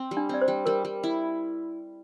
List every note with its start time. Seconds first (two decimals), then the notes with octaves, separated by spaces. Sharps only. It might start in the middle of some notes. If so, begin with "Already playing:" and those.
Already playing: C4
0.11 G3
0.17 D4
0.29 C4 D5
0.41 C5
0.48 G3
0.66 G3 A#4
0.85 G3
1.03 E4